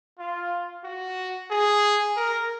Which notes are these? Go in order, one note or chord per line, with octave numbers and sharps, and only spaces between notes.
F4
F#4
G#4
A#4